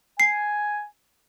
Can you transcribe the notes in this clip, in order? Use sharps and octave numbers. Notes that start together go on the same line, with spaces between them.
G#5 C7